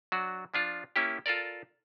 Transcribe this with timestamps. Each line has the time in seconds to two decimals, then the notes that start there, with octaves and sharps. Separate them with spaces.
0.12 F#3 D4 F#4
0.54 F3 D4 F4
0.96 A#3 C#4 E4 G4
1.26 F4 A4 A#4 D5